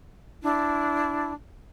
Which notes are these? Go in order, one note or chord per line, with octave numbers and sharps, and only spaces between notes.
D4 E4